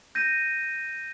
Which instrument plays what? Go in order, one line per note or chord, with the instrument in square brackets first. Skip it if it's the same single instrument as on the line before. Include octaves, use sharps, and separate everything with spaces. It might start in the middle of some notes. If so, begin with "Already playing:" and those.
[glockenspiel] G6 A#6 D#7